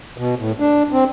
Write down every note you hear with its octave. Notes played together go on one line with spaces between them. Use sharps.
B2
A2
D4
C4